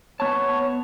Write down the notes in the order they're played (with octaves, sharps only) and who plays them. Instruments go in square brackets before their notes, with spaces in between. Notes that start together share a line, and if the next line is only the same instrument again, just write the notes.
[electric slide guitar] B3 A5 [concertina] C#5